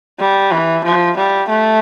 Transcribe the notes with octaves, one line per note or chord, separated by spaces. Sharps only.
G3
E3
F3
G3
A3